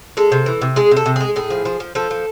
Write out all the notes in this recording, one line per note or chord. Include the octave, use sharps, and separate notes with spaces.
G#3 A4
C3
E3
C3
G#3 G#4
C3
A4
C3
G#3 G#4
A2 G#4
F3
F3
F3
F3 A4
F3